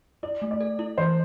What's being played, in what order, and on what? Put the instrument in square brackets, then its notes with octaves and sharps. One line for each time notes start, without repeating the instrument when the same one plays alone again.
[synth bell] E4 [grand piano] D5
[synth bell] A3
[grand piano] D5
[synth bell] A4
E4
[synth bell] E3 [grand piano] C5